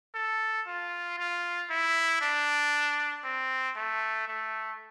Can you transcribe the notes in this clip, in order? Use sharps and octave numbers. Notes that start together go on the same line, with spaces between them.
A4
F4
F4
E4
D4
C4
A3
A3